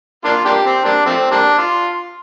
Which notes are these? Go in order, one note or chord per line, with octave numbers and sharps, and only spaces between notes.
A#3 D4 F4
A#3 D4 G4
C4
G3 A#3 D4
F3 A3 C4
G3 A#3 D4
F4